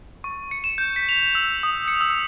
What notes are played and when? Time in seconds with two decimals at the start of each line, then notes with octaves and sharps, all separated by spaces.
0.24 C#6
0.51 C#7
0.64 E7
0.78 G6
0.96 B6
1.09 F7
1.35 E6
1.63 D#6
1.88 C#7
2.01 E6